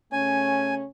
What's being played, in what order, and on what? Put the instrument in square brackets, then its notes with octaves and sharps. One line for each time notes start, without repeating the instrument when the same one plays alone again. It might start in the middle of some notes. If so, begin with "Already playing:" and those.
[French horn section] C#3 A3 C#4 [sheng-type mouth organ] G#5